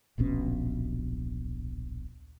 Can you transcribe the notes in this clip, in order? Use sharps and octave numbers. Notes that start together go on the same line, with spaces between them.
D1 A#1 B2 C#4